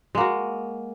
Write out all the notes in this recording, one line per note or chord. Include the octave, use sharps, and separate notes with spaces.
G#3 A#3 F#4